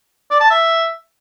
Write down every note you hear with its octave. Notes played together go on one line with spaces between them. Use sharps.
D5
A5
E5